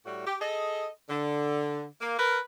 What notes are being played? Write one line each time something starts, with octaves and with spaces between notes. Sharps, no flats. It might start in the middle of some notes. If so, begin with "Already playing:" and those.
A2 G3 F#4
G4
G#4 A4 D#5
D3
A#3
A#4 B4